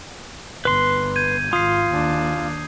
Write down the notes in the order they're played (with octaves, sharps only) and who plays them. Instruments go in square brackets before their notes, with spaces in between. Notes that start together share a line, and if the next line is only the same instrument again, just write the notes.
[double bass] G1 [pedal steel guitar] B4 C6
[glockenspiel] G6 G#6 D#7
[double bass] G#1 [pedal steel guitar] F4 [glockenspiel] D#6 C7
[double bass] D#2 D4